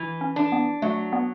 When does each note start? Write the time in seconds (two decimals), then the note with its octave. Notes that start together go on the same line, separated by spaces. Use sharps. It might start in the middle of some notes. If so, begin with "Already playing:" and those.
Already playing: E3
0.21 C#4
0.36 D4
0.52 B3
0.82 F#3 A3
1.13 B3